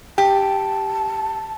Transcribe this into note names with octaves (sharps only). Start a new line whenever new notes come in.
G4 A5